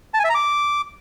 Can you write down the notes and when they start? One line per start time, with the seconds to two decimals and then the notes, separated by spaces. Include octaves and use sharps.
0.14 A5
0.19 G#5
0.24 E5
0.30 A#5
0.35 D6